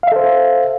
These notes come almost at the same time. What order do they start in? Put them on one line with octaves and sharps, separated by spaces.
F5 E5 A4 C5